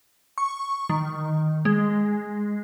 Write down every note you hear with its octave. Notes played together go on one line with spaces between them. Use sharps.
C#6
D#3
G#3